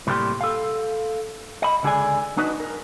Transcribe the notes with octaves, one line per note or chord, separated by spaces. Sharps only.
A2 C3 G3 A#3 G4 C6
A4 F5
D#5 B5
C#2 D3 G4 G#4 D5 G#5
D4 D#4 F#4 B4 D#5
A#4